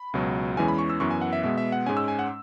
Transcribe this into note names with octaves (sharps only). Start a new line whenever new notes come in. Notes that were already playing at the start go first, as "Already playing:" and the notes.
Already playing: B5
C#2 B2 F#3
E2 E3 G#3 C#4 G#5
B5
C#6
E6
F#2 E3 B3 C#6
G#5
F#5
E5
B2 G#3 B3 E5
E5
F#5
G#2 G#3 C#4 G#5
E6
G#5
F#5